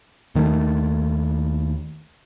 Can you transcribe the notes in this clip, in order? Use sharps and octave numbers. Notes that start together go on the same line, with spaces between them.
D#2 D#3 G#3 A3